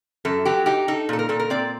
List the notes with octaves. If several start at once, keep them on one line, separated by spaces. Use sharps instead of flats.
F#2 A4
F#3 G4
D#4 G4
D#4 A4
A#2 A4
A#4
A#2 A4
A#4
C4 D5